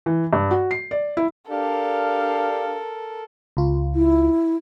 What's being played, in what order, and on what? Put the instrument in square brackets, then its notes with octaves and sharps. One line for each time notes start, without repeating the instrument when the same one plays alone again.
[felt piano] E3
G2
F#4
C7
D5
E4
[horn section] D4 G4 F5 [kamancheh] A4 A#4
[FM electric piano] C#2 F4
[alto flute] E4